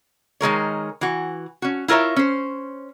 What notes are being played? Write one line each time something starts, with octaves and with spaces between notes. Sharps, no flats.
D#3 G#3 A#4 C#5
E3 F#4
C#4 F#4
E4 F4 A#4 C#5 E5
C#4 C5